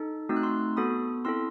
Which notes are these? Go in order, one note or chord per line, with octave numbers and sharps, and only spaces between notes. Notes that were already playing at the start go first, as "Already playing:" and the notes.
Already playing: D#4 A4
A3 C4 D#4 F#4 E6
F#6
C6 E6
B3 F#4 A4 B5 D#6
C4 E4 A4 C6 E6